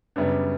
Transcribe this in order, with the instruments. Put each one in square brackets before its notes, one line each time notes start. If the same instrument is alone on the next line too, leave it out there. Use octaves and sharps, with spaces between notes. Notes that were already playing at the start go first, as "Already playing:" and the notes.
[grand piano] F#2 C#3 G3 B3 D4